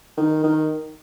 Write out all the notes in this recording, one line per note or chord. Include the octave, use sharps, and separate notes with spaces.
D#3
D#3